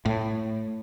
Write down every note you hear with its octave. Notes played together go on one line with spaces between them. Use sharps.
A2